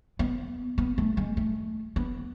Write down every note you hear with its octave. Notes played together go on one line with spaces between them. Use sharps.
B3
B3
A3
G#3
A3
B3